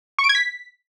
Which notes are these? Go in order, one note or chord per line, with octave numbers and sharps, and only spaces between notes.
C#6
D7
G#6
B6